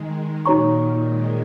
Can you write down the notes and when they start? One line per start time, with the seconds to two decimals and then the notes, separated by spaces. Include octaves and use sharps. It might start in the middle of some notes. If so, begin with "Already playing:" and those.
Already playing: D#3 G#3
0.45 A#2 D#3 D#4 F#4 C#5 A#5 C#6
1.08 D#3 G#3